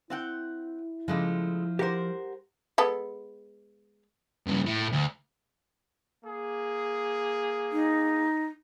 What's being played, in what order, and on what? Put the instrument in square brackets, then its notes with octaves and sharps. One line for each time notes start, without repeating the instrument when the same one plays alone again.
[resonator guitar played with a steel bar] C4 F#5 G5 [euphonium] E4
[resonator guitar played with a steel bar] C#3 G#3 A3 [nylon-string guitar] F3
[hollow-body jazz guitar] G4 F#5 [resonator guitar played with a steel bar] A#4 C5
[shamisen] G#3 B3 A4
[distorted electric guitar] G2 C#3
A2
D2
[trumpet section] A#3 G#4
[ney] D#4